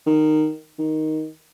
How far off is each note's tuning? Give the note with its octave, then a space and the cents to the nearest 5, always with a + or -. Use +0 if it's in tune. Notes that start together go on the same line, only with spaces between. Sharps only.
D#3 -10
D#3 +5